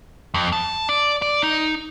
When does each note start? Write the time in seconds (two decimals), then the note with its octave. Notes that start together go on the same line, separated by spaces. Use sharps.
0.34 F2
0.53 A5
0.89 D5
1.22 D5
1.42 D#4